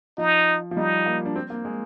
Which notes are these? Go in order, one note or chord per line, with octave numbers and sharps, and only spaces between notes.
F3 D#4
F3
G3 D#4
A#3
D4
C4
A#3
G#3